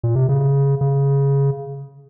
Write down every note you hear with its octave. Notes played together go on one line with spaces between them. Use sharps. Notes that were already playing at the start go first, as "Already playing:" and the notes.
A#2
C3
C#3
C#3